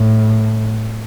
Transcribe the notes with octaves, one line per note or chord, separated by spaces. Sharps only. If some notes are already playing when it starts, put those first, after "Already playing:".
Already playing: A2